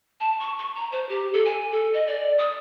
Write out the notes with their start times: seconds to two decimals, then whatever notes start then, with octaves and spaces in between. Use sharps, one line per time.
0.20 A5
0.40 C#6
0.58 C#6
0.75 A#5
0.92 C5
1.09 G4
1.33 A4
1.45 G#5
1.72 A4
1.94 D#5
2.07 D5
2.38 D#6